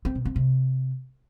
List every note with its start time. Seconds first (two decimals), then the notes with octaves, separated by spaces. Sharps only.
0.05 C4
0.15 B2
0.25 C4
0.36 C3